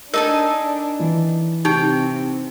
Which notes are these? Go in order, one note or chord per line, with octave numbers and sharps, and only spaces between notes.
D4 D#4 A4 A#4 G#5
E3
C3 D#4 G4 G5